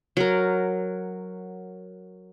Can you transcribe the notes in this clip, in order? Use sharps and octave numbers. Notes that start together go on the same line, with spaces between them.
F#3 A#4